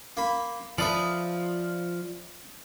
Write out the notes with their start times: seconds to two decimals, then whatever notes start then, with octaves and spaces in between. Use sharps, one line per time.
0.17 A#3 B5
0.78 F3 A4 B4 D5 E5 D#6